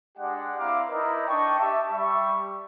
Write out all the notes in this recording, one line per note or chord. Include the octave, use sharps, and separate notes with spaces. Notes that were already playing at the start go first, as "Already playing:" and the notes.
G#3 D4 G4 D5 F#5
C4 E4 F5 A#5 D6
D#4 E4 A#4 B4 D5 D#5
D4 D#5 G5 C#6
G4 E5 A5
G3 E5 C#6